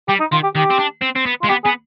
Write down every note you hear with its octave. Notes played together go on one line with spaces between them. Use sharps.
G3 G4
D#4
D#3 F4
G4
D#3 G4
C4
D4
C4
C4
B3
F4
G#3
B3 G4
B3 G#4